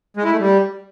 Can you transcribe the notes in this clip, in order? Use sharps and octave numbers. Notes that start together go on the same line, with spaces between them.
G#3
E4
A3
G3